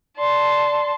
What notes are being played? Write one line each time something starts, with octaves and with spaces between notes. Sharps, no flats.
D5 A5 C6